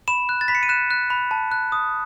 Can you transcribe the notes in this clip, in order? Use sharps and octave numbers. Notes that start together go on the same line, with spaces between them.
B5 E7
F#6
A6
B5 B6
C#7
D#7
F#6 E7
F#6
B5
A5
F#6
D#6